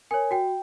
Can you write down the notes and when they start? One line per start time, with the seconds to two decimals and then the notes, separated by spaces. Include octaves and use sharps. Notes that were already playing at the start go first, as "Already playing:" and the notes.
0.11 A#4 C#5 G#5
0.31 F#4 G5